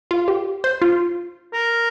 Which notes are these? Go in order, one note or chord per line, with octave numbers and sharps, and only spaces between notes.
F4
G4
C5
F4
A#4